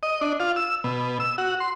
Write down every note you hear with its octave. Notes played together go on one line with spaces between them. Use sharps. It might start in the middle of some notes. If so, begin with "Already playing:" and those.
D#5
D4
F4
E6
B2
E6
F#4
C6